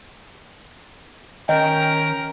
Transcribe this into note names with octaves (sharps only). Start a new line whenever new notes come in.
D#3 C#4 A#4 D#5 G5